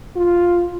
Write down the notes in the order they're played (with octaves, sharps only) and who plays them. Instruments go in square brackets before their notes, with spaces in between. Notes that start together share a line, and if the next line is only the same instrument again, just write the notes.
[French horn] F4